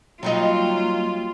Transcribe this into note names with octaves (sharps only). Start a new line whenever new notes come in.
F#3 G3 A#3 D#4 F4